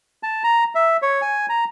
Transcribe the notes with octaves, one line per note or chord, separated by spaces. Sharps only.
A5
A#5
E5
C#5
G#5
A#5